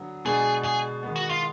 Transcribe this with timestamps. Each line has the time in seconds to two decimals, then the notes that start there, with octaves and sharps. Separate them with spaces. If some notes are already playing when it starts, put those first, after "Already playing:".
Already playing: D3 F#3 B3
0.25 B2 G#3 B3 D4 G#4
0.64 G#4
1.03 D#3 G#3 B3
1.16 F#4
1.29 F4